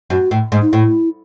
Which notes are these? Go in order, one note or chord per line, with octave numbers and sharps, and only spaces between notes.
F#2 F#4
A2
G#2
D#4
A2 E4